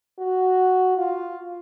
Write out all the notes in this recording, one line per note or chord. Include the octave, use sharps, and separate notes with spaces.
F#4
F4